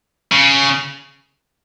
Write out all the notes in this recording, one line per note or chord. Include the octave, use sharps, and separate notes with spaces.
C#3